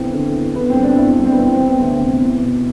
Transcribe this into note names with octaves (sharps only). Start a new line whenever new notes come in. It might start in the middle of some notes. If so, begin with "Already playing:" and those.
Already playing: E2 D3 C4
D3
E2
D3 B3
C4
G2
D4
G2 E4
D4
G2
C4
B3
E3 C4
C4
E3
B3
D2 C4
C3
E2
B2